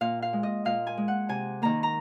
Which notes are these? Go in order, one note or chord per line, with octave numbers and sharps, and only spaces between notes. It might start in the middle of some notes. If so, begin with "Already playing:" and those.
A#2 F5
F5
G#3
D#5
A#2 F5
G#5
G#3
F#5
C3 G#5
D#3 A#3 A#5
A#5